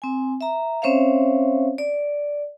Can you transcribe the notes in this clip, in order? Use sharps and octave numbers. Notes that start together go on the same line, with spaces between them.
C4 G#5
E5 A#5
C4 C#4 C5 C#5 E5 F5
D5